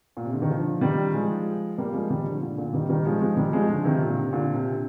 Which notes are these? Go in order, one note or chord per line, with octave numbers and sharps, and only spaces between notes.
A#2
C3
D3
D#3
D3 F3
D#3 G3
F3 G#3
G3 A#3
F3 G#3
D#3 G3
D3 F3
A#2 D3
A#2 D3
D#3 G3
D#3 G3
F3 G#3
F3 G#3
D#3 G3
F3 G#3
D3 F3
C3 D#3
A#2 D3
C3
A#2 D3
C3